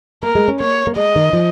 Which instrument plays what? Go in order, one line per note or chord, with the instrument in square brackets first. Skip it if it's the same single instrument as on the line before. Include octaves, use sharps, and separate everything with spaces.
[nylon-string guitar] A#3 [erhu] A#4
[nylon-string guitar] G#3
C#4
[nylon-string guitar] A#3 [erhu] C#5
[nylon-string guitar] A#3
[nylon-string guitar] G#3 [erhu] D#5
[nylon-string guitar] D#3
F3